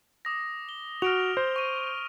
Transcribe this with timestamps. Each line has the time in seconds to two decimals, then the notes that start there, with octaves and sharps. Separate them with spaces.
0.25 D6 D#6 A#6
0.69 G7
1.02 F#4 F6 D7 F7
1.37 C5
1.56 C#6 D#7